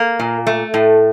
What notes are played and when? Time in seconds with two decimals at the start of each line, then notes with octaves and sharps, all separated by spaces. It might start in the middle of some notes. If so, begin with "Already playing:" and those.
Already playing: A#3
0.20 A#2
0.47 A3
0.74 A2